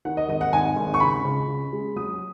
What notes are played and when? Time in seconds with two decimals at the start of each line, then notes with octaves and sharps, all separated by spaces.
0.05 D#3 F#5
0.17 D#5
0.28 G#1 D#5
0.41 F#5
0.53 G#1 G#5
0.76 G#1
0.94 C#6
1.00 C#3 B5
1.25 C#2
1.48 C#3
1.73 G#3
1.96 F#3 D#6